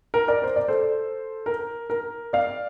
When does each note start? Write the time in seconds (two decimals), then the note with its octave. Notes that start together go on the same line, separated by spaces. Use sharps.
0.14 A#4
0.28 A#4 D5
0.43 C5
0.56 D5
0.68 A4 C5
1.46 A#4
1.90 A#4
2.33 D5 F5